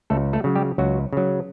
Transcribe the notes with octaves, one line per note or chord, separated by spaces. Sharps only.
C#2 A3 A4
A3 A4
C#3 F#3
G3 G4
C#2 F#3 F#4
C#3 F#3